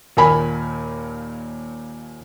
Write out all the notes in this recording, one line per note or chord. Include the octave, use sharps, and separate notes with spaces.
D#2 A#2 A#4 G#5 B5